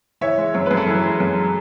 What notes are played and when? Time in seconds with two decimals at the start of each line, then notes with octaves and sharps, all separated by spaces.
0.21 E3 C#5 E5
0.37 G#3
0.54 F#2 C#5
0.66 F#2 B4
0.77 A4 C#5
0.87 E3
1.04 G#3
1.20 F#2